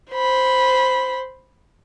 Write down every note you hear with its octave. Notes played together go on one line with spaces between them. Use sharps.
C5 B5